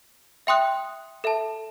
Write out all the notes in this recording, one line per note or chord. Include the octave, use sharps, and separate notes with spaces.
E5 G5 C6 D#6 F#6
A4 E5 A5